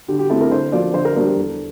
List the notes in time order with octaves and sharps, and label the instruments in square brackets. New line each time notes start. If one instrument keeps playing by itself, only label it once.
[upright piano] D3 G4
G4
A3 C4 E4 A4
A#4
D3 C5
F3 A#3 D5
D3 C5
A#4
G3 A#3 D4 C5
G4
E2 A4